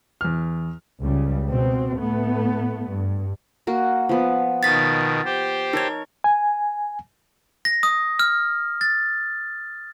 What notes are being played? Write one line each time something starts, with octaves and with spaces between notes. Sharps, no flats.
E2 F6
C#2 C#3 G3
B2 C4
A2 A3 B3
G2
A#3 F#4 A#4
F3 B3
B2 D#3 A6 B6
G4 C5
D#4 A#4 C#5 G#6
G#5
A#6
D#6
F6
A6